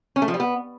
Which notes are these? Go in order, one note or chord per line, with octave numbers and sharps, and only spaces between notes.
C#4
A3
F3
G3
B3